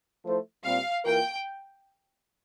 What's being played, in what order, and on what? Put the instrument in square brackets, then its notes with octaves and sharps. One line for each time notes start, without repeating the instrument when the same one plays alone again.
[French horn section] F3 A3 E4 A4 C5
[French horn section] A#2 G3 C4 [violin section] F5
[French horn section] E3 A#3 F4 A#4 [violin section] G5